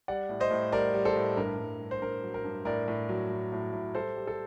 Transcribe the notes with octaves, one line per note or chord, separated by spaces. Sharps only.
G3 D5 F#5
A2
C5 D#5
A2
G3 A#4 D5
G3
A4 C5
A2
G2 A#4
G2
G2
C5
G2 A#4
F#3
A#4
G2
A2 A#4 D5
A2
F#3
A2
A2
A2
G3 A4 C5
G3
A4